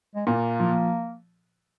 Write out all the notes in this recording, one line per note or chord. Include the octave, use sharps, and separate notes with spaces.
G#3
A#2 A#3
F3